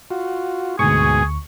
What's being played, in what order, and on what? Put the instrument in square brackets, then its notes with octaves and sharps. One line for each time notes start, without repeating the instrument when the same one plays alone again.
[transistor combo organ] F4 F#4
[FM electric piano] D2 C#6 [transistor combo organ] G#2 B2 G#5 [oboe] G#4